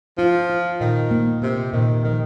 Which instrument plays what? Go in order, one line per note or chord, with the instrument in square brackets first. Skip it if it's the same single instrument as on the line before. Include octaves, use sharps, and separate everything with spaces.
[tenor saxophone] F3 [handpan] F4
[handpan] F4
[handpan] A#2 [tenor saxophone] D#3
[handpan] A#3
[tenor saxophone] C3 [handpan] A#3
[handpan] A#2 [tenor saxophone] D#3
[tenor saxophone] D#3 [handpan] F3